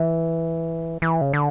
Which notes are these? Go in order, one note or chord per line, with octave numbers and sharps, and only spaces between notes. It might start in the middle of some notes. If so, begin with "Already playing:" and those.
Already playing: E3
E3
C#3
D3